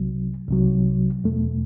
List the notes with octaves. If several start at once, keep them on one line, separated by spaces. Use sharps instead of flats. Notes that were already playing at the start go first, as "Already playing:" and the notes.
Already playing: C2 C3 F#3
C2 C3 F#3
E2 B2 A3